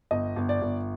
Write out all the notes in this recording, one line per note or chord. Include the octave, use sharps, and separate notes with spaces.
G1 D#5
G1
D5
G1